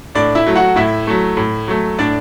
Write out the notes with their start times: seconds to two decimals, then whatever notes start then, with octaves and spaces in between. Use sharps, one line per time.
0.15 A2 D4 D5
0.35 E4 E5
0.47 F#3 A3
0.56 F#4 F#5
0.76 A2 E4 E5
1.07 F#3 A3
1.37 A2
1.68 F#3 A3
1.98 A2 D4 D5